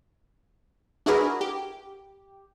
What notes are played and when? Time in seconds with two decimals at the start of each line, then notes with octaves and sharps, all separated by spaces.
1.06 D4 E4 F#4 G#4 A#4 B4
1.41 G4